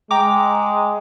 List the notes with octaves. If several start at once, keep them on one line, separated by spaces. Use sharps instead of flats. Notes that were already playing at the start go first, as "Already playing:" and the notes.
G#3 G5 A#5 D6